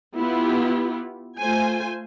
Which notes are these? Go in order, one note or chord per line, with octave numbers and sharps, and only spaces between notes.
B3 E4 F4 G4
A3 F4 C5 G#5